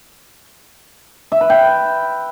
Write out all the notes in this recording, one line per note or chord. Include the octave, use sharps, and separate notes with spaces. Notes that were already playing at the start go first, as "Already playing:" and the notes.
E5
B4
G5